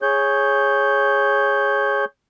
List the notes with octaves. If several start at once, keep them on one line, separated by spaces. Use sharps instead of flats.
G#4 C#5 G6